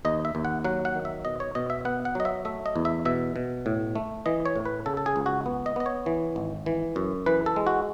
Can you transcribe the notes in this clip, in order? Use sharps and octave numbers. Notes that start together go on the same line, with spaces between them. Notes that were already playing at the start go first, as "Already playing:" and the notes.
D#2 D#5
E5
D#2
F#5
F#3 F#5
F#5
D#3
E5
B2 D#5
C#5
B2 D#5
E5
B3 F#5
F#5
F#3 D#5
E5
A3 E5
D#5
E2
E5
B2 E5
B2
A2
A3
E3 D#5
C#5
A2
B4
C#3 A4
A4
G#4
C#2
F#4
B3
D#5
B3 D#5
C#5
E3
G#1
E3
F#2
E3 B4
A4
G#3
F#4